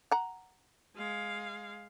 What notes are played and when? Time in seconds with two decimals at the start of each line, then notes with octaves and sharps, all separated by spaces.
0.11 F#5 A#5
0.96 G#3 F5